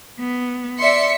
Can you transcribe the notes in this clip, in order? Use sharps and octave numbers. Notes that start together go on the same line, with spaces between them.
B3
D5 E5 C6 B6 C#7